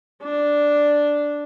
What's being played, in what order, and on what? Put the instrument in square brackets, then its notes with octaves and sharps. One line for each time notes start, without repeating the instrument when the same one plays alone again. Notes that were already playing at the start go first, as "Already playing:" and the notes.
[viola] D4